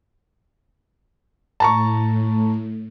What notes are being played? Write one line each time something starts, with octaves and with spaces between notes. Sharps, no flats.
A2 A5 A#5 C#6